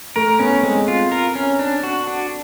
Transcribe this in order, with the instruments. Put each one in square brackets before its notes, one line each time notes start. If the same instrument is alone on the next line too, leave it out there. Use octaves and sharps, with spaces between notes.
[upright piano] A3 [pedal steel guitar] A#4
[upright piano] B3 [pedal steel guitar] C#4
[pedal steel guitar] G#3 [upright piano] C4
[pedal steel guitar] F4
A#4
C#4
D4
F#4
D4